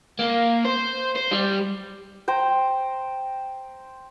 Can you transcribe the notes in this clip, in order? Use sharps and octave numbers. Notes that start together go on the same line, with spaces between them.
A#3
C5
C5
G3
C5 G5 A#5